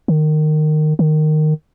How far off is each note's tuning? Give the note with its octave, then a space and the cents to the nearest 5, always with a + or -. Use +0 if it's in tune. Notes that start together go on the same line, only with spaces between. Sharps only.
D#3 -20
D#3 -15